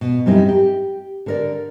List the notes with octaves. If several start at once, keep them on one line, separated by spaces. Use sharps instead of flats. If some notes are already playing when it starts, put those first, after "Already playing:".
B2
F#2 G3 C4 D#4 E4
G4
D3 A#4 D5